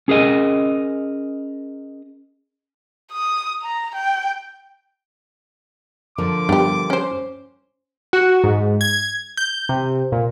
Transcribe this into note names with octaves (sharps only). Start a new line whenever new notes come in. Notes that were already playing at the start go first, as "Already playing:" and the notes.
C#4 G#4 A#4 D#5
D#6
A#5
G5
D3 F3 A#4 D6
G2 B3 G4
C#4 C5
F#4
G#2
G#6
G6
C3
A#2